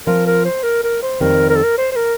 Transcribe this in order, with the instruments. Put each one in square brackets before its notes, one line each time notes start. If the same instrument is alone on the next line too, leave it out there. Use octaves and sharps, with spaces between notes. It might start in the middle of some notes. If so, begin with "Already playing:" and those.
[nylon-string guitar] F3 C4 F4 [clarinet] A#4
[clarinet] A#4
C5
A#4
A#4
C5
[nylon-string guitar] F2 D#3 G3 C4 [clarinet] A#4
[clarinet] A#4
A4
A#4
C5
C5
A#4